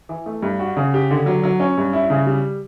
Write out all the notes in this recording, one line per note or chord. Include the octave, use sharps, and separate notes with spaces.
E3
A3
G2
F#4
C#3
G4
D3
F#3
F#3
C#4
G2
E4
C#3
G3